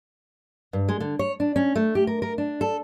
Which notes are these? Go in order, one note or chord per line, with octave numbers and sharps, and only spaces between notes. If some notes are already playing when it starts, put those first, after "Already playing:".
G2
G#3
D3
C#5
D4
C#4
A3
G4
A#4
A#4
D4
A4